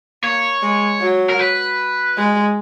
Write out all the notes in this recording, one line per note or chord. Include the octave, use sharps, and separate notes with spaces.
A#3 C#5
G#3
F#3
A#4
B4
G#3